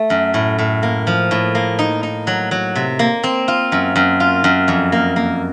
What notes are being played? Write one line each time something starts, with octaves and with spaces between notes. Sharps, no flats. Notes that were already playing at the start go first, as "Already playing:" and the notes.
Already playing: A3
F#2
A2
A2
A#3
F3
A2
A#3
D#4
D#4
F#3
F#3
C3
A#3
C4
F4
F#2
F#2
F4
F#2
F2
A#3
A#3